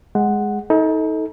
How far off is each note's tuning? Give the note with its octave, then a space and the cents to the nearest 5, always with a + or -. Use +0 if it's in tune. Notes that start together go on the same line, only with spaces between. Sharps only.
G#3 +0 F#5 +0
D#4 +35 A4 -5